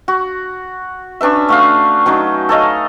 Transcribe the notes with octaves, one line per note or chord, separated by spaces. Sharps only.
F#4
C#4 D4 B4 E5
A3 F#4 F5
F#3 C#4 D#4
A4 C#5 D#5 F5